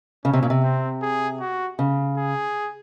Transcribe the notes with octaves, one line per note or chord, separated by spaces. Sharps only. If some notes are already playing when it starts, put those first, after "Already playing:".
C#3 C#4
C3
A#2
C3
C4
G#4
F#4
C#3
G#4